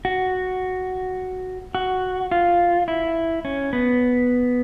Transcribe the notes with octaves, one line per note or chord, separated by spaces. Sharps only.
F#4
F#4
F4
E4
C#4
B3